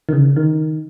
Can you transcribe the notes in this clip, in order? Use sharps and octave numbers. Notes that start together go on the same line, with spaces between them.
D#3
C#3
D#3